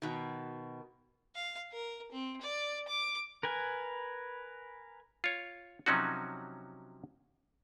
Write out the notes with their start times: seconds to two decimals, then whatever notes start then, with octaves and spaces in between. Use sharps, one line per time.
0.02 B2 D#3
1.35 F5
1.72 A#4
2.12 C4
2.41 D5
2.88 D6
3.43 A#4 B4 G#5
5.24 F4 C#5
5.86 C3 F3 F#3 C#4 D#4 F#4